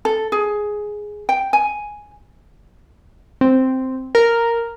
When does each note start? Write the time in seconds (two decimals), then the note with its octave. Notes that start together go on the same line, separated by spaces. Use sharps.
0.05 A4
0.32 G#4
1.29 G5
1.53 G#5
3.41 C4
4.15 A#4